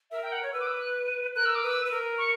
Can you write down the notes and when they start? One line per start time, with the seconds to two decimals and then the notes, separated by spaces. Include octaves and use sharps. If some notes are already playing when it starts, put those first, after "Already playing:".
0.11 A#4 E5
0.23 G5
0.32 F#5
0.43 C#5
0.53 B4 E6
0.60 D6
0.67 E6
0.80 F#6
1.35 A#4 F#6
1.46 E6
1.55 D6
1.63 B4 E6
1.85 B4
1.91 A#4
2.18 C#6